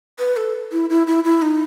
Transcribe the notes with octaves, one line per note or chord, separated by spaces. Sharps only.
B4
A4
E4
E4
E4
E4
D#4